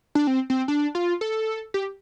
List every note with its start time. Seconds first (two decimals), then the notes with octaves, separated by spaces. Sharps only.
0.15 D4
0.27 C4
0.50 C4
0.68 D4
0.95 F4
1.21 A4
1.74 G4